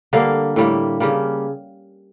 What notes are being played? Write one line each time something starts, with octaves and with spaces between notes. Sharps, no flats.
D3 G3 A#3 F5
A2 G3 A#3
C#3 G3 A#3